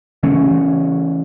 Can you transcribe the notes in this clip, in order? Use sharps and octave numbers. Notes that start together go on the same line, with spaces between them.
C#3 E3 A3 C#4